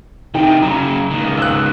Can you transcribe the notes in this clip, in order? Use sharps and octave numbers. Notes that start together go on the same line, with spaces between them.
C3 D#3 D#4 G5
C#3 F#3 A#5
C#2 D#3
E6 F#6